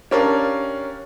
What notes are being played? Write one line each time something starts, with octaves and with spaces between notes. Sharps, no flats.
C#4 D4 G4 A#4 F5